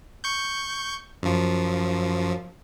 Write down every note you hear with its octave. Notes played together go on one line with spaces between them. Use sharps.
C#6 G6
F#2 F3